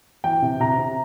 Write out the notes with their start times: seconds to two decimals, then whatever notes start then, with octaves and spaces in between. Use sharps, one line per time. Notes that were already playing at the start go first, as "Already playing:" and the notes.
0.24 E3 G5
0.42 C3
0.60 C3 A#5
0.78 C3